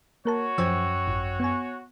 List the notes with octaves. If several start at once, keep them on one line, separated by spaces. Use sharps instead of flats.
A#3 F#4 A#4 C#5 A5
F#2 F3 C5 G5 E6 G#6
G#1
B3 G#5